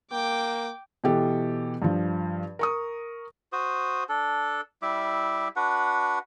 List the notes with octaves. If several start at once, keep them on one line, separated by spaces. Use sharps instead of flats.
A#3 G5 D6
B2 E3 G4 A4
G2 F3
A#4 C#6 D#6
F#4 C5 D#6
D4 A4
G3 E4 E5 D6
D4 F#4 B4 F#5